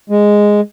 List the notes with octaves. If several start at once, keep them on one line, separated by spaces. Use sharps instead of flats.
G#3